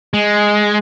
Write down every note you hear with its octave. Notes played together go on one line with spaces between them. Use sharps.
G#3